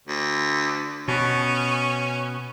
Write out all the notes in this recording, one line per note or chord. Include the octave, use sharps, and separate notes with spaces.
D2
B2 C#4